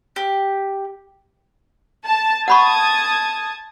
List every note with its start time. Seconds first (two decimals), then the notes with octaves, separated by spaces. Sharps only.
0.16 G4
2.05 A5
2.48 F#5 A5 B5 C#6 D#6 G#6